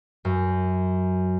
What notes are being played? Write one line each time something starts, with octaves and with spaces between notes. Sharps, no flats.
F#2